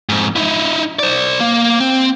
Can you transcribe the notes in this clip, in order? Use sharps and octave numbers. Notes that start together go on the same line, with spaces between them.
F2 G#2
D#4 E4
C5 D5
A#3
C4